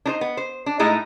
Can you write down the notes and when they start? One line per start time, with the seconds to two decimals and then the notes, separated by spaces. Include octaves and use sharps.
0.06 D4 D#4 C5
0.21 B3
0.37 C5
0.66 D4
0.79 A2 G#3 A3 D#4 E4